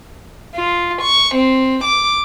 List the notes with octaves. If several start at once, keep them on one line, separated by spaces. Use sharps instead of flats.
F4
C#6
C4
D6